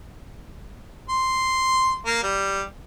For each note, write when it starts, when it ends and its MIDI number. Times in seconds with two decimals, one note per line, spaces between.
1.09 1.98 84
2.06 2.21 58
2.23 2.63 55